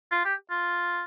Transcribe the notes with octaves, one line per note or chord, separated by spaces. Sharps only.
F4
G4
F4